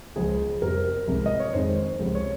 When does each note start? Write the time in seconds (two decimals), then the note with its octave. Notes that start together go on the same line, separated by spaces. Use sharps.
0.16 C#2 C#3 F3 G#4
0.62 F2 C3 G3 A#4
1.07 C2 C3 F3 G#3
1.26 D#5
1.40 C#5
1.54 F2 D#3 G#3 C5
1.99 C#2 C3 F3 G#3
2.15 C#5